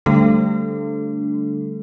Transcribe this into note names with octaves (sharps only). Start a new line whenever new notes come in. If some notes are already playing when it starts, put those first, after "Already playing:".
D3 G3 A3 D4 A4